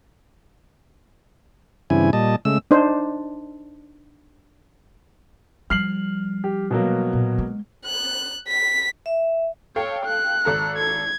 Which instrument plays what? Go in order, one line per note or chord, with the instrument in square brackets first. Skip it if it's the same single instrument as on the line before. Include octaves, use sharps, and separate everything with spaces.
[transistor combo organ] G2 C#3 E3 C4 E4 G#5
A#2 G3 D#5 A5
C#3 G#3 A3 E6
[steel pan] D4 D#4 C5
[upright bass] F3 G3 [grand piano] F6 C7 F#7
[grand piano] G4
B2 F#3 A#3
[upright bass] A#2
G#3
[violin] F#6
B6
[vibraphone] E5
[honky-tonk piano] A4 F5 G5 [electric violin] C#5
[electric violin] F#6
[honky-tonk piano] G#1 A4 A#5
[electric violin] G#6